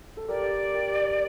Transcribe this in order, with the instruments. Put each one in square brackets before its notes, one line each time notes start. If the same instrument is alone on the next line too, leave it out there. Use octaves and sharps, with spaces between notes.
[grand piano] A4
[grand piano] G4 A#4 [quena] D5
[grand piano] G4 A#4